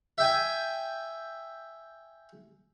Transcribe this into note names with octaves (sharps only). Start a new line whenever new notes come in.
E5 G5 G#5